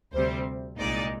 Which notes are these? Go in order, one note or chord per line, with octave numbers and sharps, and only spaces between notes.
D2 C3 G3 C4 C5
C2 A#2 G#3 D#4 D5